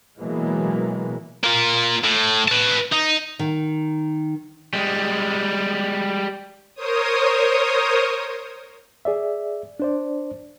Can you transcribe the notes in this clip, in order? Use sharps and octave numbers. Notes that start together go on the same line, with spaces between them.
B2 E3 F#3 G#3 A#3
A#3 F4
A2
B4 A5
D#4
D#3
G3 G#3
A#4 C5 C#5 D#6
G#4 D5 E5
D4 C5 D5